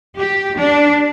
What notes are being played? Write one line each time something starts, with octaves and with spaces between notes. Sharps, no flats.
G4
D4